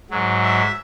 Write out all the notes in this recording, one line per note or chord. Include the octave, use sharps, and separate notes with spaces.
G#2 F#3
E5